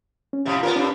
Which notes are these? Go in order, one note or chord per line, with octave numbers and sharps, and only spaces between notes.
C#4
F2 A2 C3
B3 C#4 F4 A#4
G2 C#4 D4